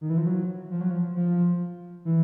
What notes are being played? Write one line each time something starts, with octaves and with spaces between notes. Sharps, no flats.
D#3
E3
F3
F#3
F3
F#3
F3
F3
E3